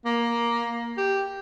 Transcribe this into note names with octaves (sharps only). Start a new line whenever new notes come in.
A#3
G4